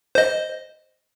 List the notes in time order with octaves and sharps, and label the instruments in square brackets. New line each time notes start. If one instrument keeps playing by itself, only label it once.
[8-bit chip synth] C5 D#5